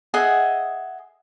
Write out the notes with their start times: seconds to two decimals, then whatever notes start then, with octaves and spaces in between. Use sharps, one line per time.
0.14 G#4 D#5 E5 F#5